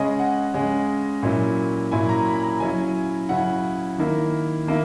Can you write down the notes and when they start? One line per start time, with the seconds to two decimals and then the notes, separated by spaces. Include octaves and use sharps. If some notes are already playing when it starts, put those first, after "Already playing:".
Already playing: C#3 G#3 C#4 D#5
0.19 F#5
0.54 C#3 G#3 C#4
1.23 A#2 F#3 C#4 E4
1.91 A#2 F#3 C#4 E4 G#5
2.09 A#5
2.26 B5
2.43 A#5
2.60 C#3 F#3 C#4 E4 G#5
3.29 C#3 F#3 C#4 E4 F#5
3.98 D#3 A#3 E4
4.67 D#3 A#3 E4